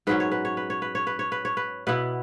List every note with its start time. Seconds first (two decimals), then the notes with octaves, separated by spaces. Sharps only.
0.07 G#2 F#3 C#4 B4
0.20 C#5
0.31 B4
0.45 C#5
0.57 B4
0.70 C#5
0.82 B4
0.95 C#5
1.07 B4
1.19 C#5
1.32 B4
1.45 C#5
1.57 B4
1.87 B2 B3 E4 B4